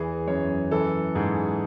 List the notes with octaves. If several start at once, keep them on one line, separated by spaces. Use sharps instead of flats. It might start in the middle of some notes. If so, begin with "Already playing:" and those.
Already playing: E2 E3 G#4
F#2 C#5
E3 A4
G#2 G#4